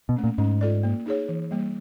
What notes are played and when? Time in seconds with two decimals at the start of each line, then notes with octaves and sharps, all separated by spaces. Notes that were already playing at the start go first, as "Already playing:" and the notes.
0.09 B2
0.16 A3 C#4
0.24 A#2
0.38 G#2 C#4
0.61 F4 A4 D5
0.83 A#3
1.06 D#4 G#4 C#5
1.29 E3
1.51 G3 A#3